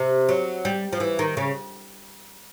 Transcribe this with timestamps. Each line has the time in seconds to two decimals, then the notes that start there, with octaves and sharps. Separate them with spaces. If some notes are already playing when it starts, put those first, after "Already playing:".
Already playing: C3
0.29 F#3
0.65 G3
0.93 F3
1.00 E3
1.19 D#3
1.37 C#3